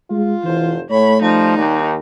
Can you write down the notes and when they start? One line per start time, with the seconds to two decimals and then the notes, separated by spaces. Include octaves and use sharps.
0.10 G#3 F4
0.43 F1 E3 C5
0.90 A2 A3 C#5 B5
1.22 F3 G3 D#4
1.57 D#2